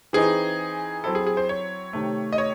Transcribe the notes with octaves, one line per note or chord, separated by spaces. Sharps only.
E3 C4 D#4 G#4
F#3 C4 E4 A4
G#4
G#4
C5
C#5
C3 D#3 A3
D#5
C#5